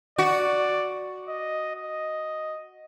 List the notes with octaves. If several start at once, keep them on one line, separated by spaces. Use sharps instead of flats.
F#4 D5
D#5
D#5